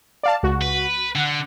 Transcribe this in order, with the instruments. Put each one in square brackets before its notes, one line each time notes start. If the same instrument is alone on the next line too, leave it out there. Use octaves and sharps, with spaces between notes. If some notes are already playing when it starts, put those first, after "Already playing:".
[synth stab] D5 F5 A5
C#2 F#4
[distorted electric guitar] B4
[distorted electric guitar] D3 [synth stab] F#5